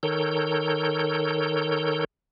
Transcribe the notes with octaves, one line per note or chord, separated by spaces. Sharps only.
D#3 A4 A#4 C#5 G6